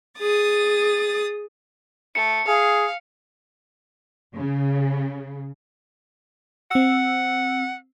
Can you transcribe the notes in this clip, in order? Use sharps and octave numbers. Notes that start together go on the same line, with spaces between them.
G#4 D#6 A6
A3 C#7
G#4 F5
C#3
C4 F#5 E6